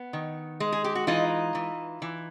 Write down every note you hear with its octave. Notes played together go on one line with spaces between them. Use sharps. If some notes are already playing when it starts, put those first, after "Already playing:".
Already playing: B3
D#3
G#3
G#4
G4
F#4
E3 D#4 F4
E3
E3